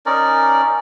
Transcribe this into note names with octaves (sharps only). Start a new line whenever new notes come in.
C#4 D#4 A#4 D5